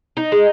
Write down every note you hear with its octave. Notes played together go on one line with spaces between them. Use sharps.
D#4
G#3